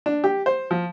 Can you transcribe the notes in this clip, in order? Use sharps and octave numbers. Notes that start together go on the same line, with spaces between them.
D4
G4
C5
F3